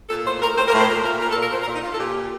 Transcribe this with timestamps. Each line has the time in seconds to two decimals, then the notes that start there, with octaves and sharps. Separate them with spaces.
0.09 A#2 A4
0.25 A2 C5
0.41 A2 A#4
0.56 A2 C5
0.67 A#4
0.72 A2
0.78 C5
0.88 A#2 A#4
1.04 A#2 A#4
1.20 A#2 A#4
1.30 A4
1.36 A#2
1.41 A#4
1.52 A#2 C5
1.62 A#4
1.67 A#2
1.73 D#4
1.83 A#2 F4
1.92 A4
1.99 A#2 G4
2.15 A#2